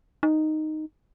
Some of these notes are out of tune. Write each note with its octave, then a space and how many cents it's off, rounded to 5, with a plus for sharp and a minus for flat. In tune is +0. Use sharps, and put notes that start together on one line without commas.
D#4 -5